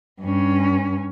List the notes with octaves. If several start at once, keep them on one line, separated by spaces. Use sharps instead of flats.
G2 C#4